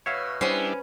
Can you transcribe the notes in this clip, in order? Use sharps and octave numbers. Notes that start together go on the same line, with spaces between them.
B2 C#5 E5 F5
G3 B3 C#4 D4 E4 C5 C7